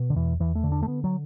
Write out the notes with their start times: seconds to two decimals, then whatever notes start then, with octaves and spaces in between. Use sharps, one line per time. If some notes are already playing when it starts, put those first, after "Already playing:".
Already playing: B2
0.10 D3
0.16 E2 E3
0.40 E2 E3
0.55 A3
0.64 D3
0.72 D4
0.83 A3
0.87 D3 B3
1.04 F#3